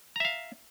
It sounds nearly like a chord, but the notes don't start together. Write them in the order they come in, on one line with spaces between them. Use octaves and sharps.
A#5 E5 F5